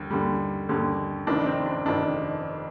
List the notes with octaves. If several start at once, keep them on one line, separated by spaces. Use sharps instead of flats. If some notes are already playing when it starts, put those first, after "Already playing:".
Already playing: D#2 D3 G3
D#2 D3 G3
D#2 D3 G3
F1 F2 D#3 D4
C4
D4
F1 F2 D#3 D4